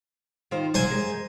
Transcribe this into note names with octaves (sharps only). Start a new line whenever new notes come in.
D#3 F4 C5
F#3 A#3 C5 G#5
F#2 G#3